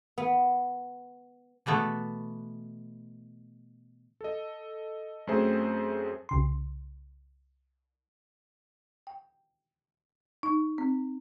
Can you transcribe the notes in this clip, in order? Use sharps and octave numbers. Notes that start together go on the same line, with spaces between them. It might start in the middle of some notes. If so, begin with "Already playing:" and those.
B3
B2 E3 A3 B3
A4 D#5
F#2 A3 C4 G#4 C5 E5
C2 C#3 C6
G5
D#4
C4